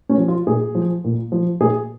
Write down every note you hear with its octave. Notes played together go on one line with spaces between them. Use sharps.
C#4
F3
F4
A#2 G#4
F3
A#2
F3
A#2 G#4